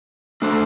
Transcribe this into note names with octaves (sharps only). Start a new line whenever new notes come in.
A3 D4 A4 C5